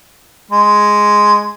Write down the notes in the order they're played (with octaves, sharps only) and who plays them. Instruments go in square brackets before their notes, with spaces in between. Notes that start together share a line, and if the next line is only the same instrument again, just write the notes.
[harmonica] G#3